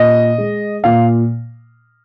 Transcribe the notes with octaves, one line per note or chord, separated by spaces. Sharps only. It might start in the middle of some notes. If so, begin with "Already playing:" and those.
Already playing: A#2 D#5
G#3
A#2 F5